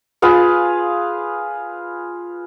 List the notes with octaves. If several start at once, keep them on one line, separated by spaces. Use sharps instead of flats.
F4 G#4 B4 F5